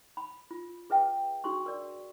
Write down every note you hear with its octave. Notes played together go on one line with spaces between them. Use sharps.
B5
F4
G#4 B4 E5 G5
D4 F#4 G#4 C6 C#6
A#4 D5